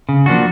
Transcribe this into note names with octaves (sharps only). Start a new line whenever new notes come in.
C#3
F3 A#3 D4 F#4